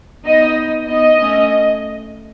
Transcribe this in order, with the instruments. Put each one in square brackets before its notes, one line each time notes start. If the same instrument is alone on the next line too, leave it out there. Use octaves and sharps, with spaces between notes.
[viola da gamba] B3 D#4 [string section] D#5
[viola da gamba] B3 D#4 [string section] D#5
[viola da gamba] A3 C#4